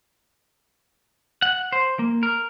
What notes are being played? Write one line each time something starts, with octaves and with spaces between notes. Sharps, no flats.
F#5
C5
A#3
A#4